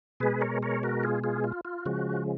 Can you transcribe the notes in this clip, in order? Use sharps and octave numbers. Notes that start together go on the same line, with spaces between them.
B2 G#3 G#4 B4
A#4 C#5
A#4 C#5
F#4 A#4
F4 G#4
F4 G#4
F4
F4
C#3 F3 G#3 F#4